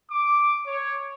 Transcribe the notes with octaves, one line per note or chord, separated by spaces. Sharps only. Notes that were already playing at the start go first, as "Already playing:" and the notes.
D6
C#5